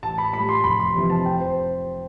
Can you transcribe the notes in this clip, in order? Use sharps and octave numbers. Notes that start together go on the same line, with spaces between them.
A1 A5
B5
A2 G3 B5
C6
F1 B5
C6
F2 C3 E3
A5
F2 G5
C5